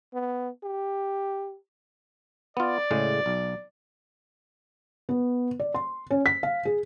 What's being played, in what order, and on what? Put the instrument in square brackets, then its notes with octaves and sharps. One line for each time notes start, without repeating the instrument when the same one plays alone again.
[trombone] B3
G4
[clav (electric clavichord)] B3 F4 [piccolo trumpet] D5
[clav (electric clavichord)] A2 C#3 G#3
B1
[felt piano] B3
D5
C6
C#4
B6
F5
G#4